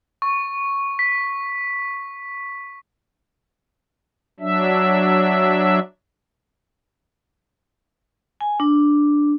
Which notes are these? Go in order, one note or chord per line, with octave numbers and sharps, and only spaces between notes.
C#6
B6
F#3 D4 E5
G#5
D4